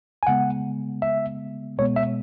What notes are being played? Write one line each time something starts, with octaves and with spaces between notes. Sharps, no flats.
G#5
C#3 G#3 B3 F#5
E5
B2 G#3 B3 C#5
E5